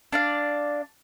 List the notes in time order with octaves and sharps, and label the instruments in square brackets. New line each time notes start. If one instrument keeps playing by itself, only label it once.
[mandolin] D4 D5 F5